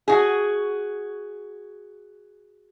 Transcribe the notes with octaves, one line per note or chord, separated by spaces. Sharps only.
F#4 G#4